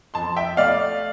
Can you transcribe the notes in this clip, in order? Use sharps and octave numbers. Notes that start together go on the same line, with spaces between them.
F2 A5 C6
E5 G5
A3 D5 F5